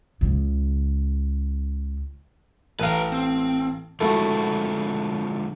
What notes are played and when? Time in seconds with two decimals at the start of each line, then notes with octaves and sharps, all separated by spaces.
0.21 C#2 C#3
2.80 A1 B4 F5 A#5
3.12 C4
4.01 D3 F3 G#3 A3 E4 F#4